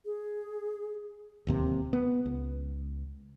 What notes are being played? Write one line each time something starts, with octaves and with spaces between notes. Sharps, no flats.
G#4
D1 D#2 C3
B3
C#2